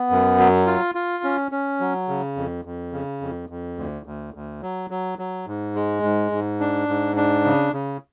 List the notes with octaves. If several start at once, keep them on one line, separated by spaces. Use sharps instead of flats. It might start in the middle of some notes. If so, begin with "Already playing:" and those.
Already playing: B3
F#2
F#3
F4
F4
C#4
C#4
F#3
C#3
F2
F2
C#3
F2
F2
D2
D2
D2
F#3
F#3
F#3
G#2
G#3
G#2
G#2
D4
G#2
D4
C#3
C#3